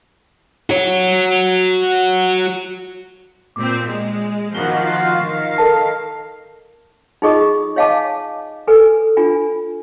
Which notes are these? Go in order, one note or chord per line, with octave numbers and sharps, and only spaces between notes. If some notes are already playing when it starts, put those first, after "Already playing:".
F#4 C#5
A#2 C4 D6
G#3
D#3 F3 A#3 B3 F#4 G7
F4 F#4 F5
D#3 F5
A4 A#4 A5
D#4 F4 G#4 D#5 C#6 D#6
C#5 D#5 F5 G#5 A5 D6
A4 B4 G#5
D4 F4 G#5